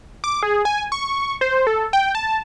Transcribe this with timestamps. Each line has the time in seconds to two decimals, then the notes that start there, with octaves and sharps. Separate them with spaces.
0.24 D6
0.43 G#4
0.65 G#5
0.92 C#6
1.41 C5
1.67 A4
1.93 G5
2.15 A5